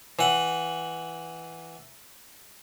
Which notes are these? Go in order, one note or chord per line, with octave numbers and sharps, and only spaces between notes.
E3 F#5